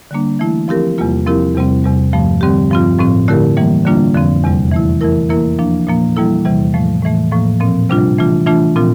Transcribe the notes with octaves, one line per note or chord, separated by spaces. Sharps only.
D3 G3 A#3 D4
E3 A3 E4
F3 C4 E4 G4 A#4
E2 C3 G3 A#3 F4
F3 C4 E4 G4 A#4
E2 C3 G3 C4
E2 C3 G3
G2 F3 A3
D3 G3 C4 G4
G2 F3 C4 F4
A2 F3 C4
D3 A3 E4 G4 A#4
E3 G3 A#3
D3 G3 A#3 D4 F4
F2 D3 F3 C4
E2 C3 G3
E3 A3 E4
E3 A3 E4 A#4
E3 A#3 E4 A#4
F3 A#3 D4
A#2 F3 A#3
E3 G3 A#3 E4 A4
E2 C3 E3 G3
A2 F3 A3
A2 E3 A3
A2 F3 A#3
A#2 F3 C4
C3 G3 D4 F4
E3 A3 D4 F4
E3 A3 D4 F4
A#2 F3 C4 F4